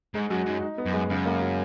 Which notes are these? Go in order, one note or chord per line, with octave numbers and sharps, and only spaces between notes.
G#2 G#3
F#2 F#4
F#2 D#4
D#4
B3
F#2
G#3
F#2 C#3
A#3
F#3